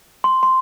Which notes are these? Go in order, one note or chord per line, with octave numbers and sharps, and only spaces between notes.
C6
C6